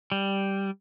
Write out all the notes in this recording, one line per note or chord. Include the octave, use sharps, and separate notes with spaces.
G3